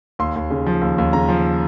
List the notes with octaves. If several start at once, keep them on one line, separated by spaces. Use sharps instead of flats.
D#2 C6
D#2
C#3
F3
D#2
D#2
C#3 A#5
F3